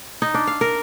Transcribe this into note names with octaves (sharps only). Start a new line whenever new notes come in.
D#4
D4
F5
A#4